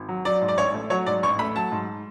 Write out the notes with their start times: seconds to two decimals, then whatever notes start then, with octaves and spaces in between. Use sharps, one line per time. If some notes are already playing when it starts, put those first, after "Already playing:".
Already playing: G#1
0.08 F#3
0.25 F#3 D5
0.41 G#2
0.48 D5
0.58 A1 C#5
0.74 A3
0.90 F#3 C#5
1.06 G#2 D5
1.23 A1 C#6
1.39 A3 B5
1.56 F#3 A5
1.72 G#2